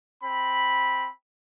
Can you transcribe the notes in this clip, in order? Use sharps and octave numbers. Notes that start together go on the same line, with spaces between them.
C4 B5